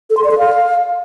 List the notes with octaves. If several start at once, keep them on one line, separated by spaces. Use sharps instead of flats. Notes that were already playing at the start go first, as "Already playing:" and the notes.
A4
C6
D5
A4
F5